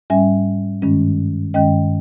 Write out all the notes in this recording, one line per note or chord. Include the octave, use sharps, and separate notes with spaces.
G#2 G3 C#4 E5 G#5
G2 D#3 G#3 C#4
G2 D#3 G#3 C#4 D#5 G5